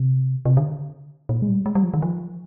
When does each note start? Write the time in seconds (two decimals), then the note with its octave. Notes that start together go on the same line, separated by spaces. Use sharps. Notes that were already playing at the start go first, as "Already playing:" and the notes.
Already playing: C3
0.45 C3
0.57 D3
1.29 A#2
1.42 G#3
1.48 G3
1.66 G#3
1.75 G3
1.83 F3
1.94 D#3
2.02 F3